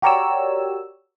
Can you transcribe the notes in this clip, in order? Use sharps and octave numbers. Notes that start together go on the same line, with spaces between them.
F#4 G4 A#4 C#5 D5 E6